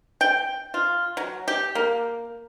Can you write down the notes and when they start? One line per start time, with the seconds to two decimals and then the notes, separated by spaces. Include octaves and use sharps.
0.21 G5
0.74 F4
1.17 F#3
1.48 G4
1.75 A#3